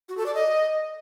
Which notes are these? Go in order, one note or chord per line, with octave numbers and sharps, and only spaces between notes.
F#4
A4
D5
D#5